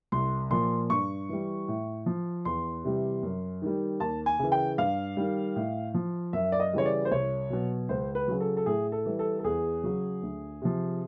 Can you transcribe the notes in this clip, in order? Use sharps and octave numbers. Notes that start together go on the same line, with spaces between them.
C2 C6
A#2 F3 C6
G2 C#6
E3 G3
A2
F3
E2 C6
C3 E3 G3
F#2
D#3 G3
D#2 A5
G#5
C#3 E3
G5
G2 F5
D#3 G3
A2
F3
F#2 E5
D5
D#5
C#3 E3 G3 C#5
D5
C5
C2 C#5
B2 F#3
C#2 C5
B4
C#3 F#3
A4
A4
A2 G#4
A4
E3 G3
A4
A4
E2 G#4
C#3 F#3
D2
C3 F3